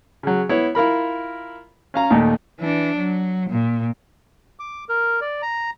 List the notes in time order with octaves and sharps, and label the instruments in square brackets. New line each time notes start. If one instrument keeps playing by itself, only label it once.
[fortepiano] C#3 F#3
B3 E4 C#5
E4 F4 A#4 B5
C#4 F5 A#5
D#2 A#2 A3 D#4
[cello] E3 D4
F#3
A#2
[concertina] D6
A#4
D5
A#5